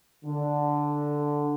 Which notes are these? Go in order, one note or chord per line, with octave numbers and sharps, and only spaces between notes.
D3